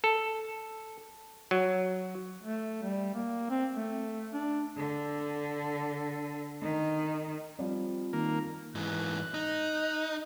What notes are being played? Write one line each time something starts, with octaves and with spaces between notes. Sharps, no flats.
A4
F#3
A3
G3
A#3
C4
A3
D4
D3
D#3
F3 G3 C4
D#3 A#3
G#2 E3 F#6
D#4